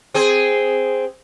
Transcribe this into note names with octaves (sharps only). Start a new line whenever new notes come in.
C4 G#4